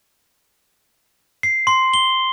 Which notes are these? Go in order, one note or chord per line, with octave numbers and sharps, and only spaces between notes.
C7
C6
G7